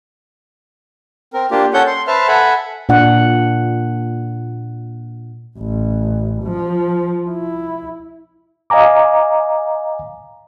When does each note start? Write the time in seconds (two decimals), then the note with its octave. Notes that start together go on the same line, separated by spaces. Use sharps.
1.34 C4 A#4
1.51 A#3 D4 F4 G4
1.74 C#4 A4 C#5 F#5 G6
1.87 C6
2.07 B4 C5 E5 A5 F6
2.28 A4 E5 F#5 G#5 B5
2.89 A#2 D4 F#5
5.58 A1
6.44 F3
7.30 E4
8.70 D#5 F5 G#5 A#5 D6